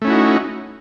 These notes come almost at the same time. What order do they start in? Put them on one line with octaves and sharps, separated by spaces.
A3 C#4 E4 F#4 D#4